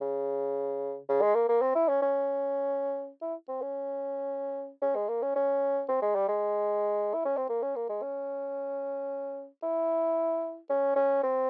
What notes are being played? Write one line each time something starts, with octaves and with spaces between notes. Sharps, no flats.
C#3
C#3
G#3
A#3
A#3
C4
E4
C#4
C#4
E4
C4
C#4
C#4
G#3
A#3
C#4
C#4
C4
G#3
G3
G#3
E4
C#4
C4
A#3
C#4
A#3
G#3
C#4
E4
C#4
C#4
C4